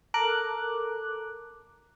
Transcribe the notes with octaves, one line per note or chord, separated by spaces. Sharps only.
A4 A#4 D6 F#6